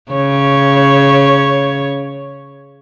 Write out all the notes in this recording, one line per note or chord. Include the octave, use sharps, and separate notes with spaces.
C#3 C#5